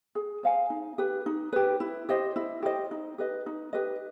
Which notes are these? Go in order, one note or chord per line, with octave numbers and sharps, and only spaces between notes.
G#4
C5 F5 G#5
D#4
G4 B4
D#4
G4 B4
E4
G4 C5 D#5
E4
G4 C5 D#5
D#4
G4 B4 D#5
D#4
G4 B4 D#5